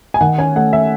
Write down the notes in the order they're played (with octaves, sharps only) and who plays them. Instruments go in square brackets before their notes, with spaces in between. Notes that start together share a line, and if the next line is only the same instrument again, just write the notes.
[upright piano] G#5
D#3 F#5
C#4 G#5
A3 F#5
E5